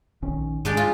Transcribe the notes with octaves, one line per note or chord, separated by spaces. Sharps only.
A#1 D#3 C#4
G#2 G#3 D4 G4
F4